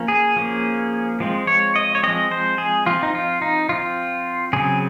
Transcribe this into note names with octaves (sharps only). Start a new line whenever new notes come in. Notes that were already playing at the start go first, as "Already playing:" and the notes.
Already playing: F3 A#3 C#4
G#4
F3 A#3 C#4
F3 G#3 C4
C#5
D#5
C#5
F3 G#3 C4 D#5
C5
G#4
F3 C4 F4
D#4
F4
D#4
F3 C4 F4
C#3 F#3 C4 G#4